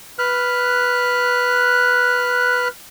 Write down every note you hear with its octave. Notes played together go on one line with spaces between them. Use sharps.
B4 F6 F#6